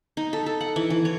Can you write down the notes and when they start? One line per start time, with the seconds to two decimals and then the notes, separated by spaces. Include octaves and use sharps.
0.17 D#4
0.33 A4
0.46 A4
0.61 F#5
0.76 E3
0.90 E3
1.05 C#5